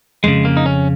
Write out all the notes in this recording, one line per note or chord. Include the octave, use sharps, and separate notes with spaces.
F2 C#3 G#3
A#3
D#4
C#4